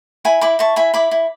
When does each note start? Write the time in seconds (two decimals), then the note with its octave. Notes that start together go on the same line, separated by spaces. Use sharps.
0.25 E4 G#5 B5
0.41 E4 B5 D6
0.59 E4 A5 C#6
0.76 E4 G#5 B5
0.94 E4 B5 D6
1.11 E4